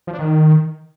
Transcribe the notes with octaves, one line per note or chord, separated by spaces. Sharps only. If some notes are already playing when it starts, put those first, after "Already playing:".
F3
D4
D#3